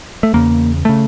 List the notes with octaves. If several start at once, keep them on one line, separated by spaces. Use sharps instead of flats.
A3
E2 C#3 A#3
C#3 A3